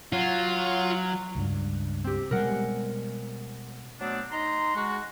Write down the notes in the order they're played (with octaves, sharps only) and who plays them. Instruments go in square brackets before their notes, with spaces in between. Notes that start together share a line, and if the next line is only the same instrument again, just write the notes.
[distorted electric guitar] F#3 [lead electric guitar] F4
[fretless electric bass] C#2 G2
[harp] C4 G4
[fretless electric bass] B2 G3 G#3 [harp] A#4 F#5
[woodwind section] F#3 A3 B3 C4 D4
D#4 A#5 C6
G#3 F#4